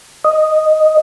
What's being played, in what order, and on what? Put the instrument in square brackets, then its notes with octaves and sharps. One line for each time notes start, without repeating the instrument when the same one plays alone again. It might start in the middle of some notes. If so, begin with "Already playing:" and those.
[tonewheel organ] D#5